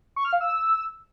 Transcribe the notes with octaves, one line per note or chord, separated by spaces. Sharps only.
C#6
F6
F5
E6